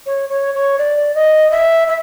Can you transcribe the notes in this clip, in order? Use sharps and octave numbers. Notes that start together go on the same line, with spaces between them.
C#5
C#5
C#5
D5
D#5
E5
E5